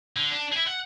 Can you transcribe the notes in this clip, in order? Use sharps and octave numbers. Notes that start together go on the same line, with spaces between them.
D3
D4
E4 G#4
F#5